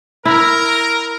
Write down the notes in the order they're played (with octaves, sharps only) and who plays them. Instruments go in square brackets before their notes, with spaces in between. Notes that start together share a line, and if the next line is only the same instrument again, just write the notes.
[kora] E4 [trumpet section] A#4